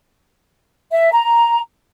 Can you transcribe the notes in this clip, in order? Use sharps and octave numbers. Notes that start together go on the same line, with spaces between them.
E5
A#5